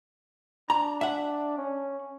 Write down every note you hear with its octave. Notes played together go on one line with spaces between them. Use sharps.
D4 A#5
E5 F#5
C#4